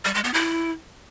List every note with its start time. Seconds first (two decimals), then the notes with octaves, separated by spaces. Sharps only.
0.05 G3
0.14 G#3
0.24 B3
0.33 E4